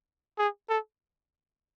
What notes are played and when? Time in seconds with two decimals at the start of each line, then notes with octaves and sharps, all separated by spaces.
0.38 G#4
0.69 A4